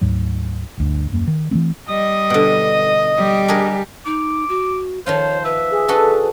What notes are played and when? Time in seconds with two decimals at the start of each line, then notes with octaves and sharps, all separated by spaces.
0.01 D2 G#2 F#3
0.77 G1 D2
1.10 D#1 F#2 A#3
1.27 D#3
1.51 E3 F3 A3 C4
1.89 G3 D#5 D#6
2.30 B2 D3
3.17 G3 G4
3.48 D4 G#4 A#4
4.06 D#4 D6
4.49 F#4
5.06 D#3 F3 F4 C5 C#5
5.45 B4 E5
5.70 G#4
5.88 D4 F#4 A4 B4